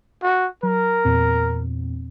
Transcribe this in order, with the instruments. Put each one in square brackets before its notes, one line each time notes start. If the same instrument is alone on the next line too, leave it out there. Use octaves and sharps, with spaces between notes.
[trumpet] F#4
[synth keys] F#3 [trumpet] A#4
[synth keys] E2 A#2 C4